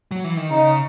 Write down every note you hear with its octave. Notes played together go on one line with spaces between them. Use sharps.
F#3
E3
D#3
C#3 D#4